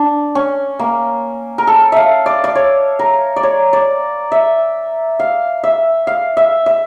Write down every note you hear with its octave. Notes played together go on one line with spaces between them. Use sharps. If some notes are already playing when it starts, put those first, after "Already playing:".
Already playing: D4
C#4
A#3
A#4
A4
E5 F5
D5
D5
C#5
A#4
D5
C#5
D5
E5
F5
E5
F5
E5
E5